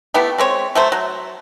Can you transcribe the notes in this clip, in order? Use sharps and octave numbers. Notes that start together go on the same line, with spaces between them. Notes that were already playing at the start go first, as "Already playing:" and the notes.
A3 B3 E4 G4
G#3 C4 C#5
F#3 A3 C5
F#3